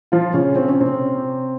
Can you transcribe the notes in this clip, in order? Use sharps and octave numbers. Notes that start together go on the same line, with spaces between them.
F3 F4
C#3 C#4
C4
C#4
C3 C4